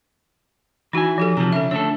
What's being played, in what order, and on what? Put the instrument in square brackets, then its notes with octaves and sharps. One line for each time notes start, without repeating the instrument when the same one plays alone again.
[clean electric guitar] E3 E4 G#5 [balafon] D#4 F#4
[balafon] F3 G4 A4
[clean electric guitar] C3 F3 [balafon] A#5
[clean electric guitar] C#3 [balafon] A4 E5
[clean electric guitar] D3 A3 A4 [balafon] C#5